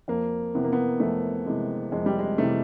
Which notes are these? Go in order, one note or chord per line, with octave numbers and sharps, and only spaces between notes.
F2 A#3
C3 E3 B3
A#3
B3
F2 A3
C3 E3 G#3
F2 G#3
G3
G#3
C3 E3 A3